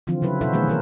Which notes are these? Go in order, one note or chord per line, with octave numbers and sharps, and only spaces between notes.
D3 E3 F3 C4 F4
C#3 F#3 E4 B4
B2 E4 F#4 A4 C5 E5
D#3 E3 F#3 A3 G#4 B4
D#3 E4 A#4